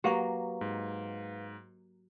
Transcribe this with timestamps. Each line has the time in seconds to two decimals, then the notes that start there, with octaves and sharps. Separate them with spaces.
0.04 F#3 A#3 G4 B4 F5 C#6
0.61 G#2